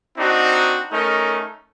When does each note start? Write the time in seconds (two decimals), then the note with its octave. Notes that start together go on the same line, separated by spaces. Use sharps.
0.16 C4 D4 D#4 F#4
0.91 A3 C#4 D#4 A#4